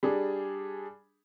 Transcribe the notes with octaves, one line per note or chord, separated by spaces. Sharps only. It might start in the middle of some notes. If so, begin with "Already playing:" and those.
G3 D4 G#4